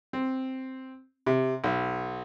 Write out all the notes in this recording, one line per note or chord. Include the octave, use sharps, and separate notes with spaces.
C4
C3
B1